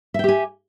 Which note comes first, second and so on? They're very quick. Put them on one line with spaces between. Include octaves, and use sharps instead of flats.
E5 G5 G4 G#5